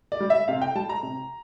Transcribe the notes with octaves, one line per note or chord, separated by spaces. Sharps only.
D5
G3
E5
C3 F5
G5
G3 A5
A#5
C3